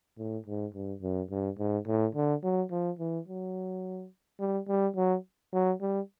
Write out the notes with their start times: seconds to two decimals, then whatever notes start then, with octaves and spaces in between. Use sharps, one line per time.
0.18 A2
0.46 G#2
0.74 G2
1.02 F#2
1.30 G2
1.58 G#2
1.87 A2
2.15 D3
2.44 F#3
2.71 F3
2.99 E3
3.28 F#3
4.40 G3
4.68 G3
4.96 F#3
5.53 F#3
5.81 G3